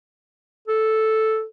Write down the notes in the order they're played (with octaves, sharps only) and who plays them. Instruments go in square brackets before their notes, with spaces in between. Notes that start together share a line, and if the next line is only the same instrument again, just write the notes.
[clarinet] A4